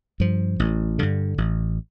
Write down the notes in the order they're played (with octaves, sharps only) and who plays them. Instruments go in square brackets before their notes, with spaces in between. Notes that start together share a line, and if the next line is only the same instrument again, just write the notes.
[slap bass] G2 F3
A1
G2 D3
A1